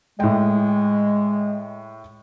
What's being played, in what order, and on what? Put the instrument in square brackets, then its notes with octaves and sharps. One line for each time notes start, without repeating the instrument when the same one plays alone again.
[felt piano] A2 G5 [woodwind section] G#3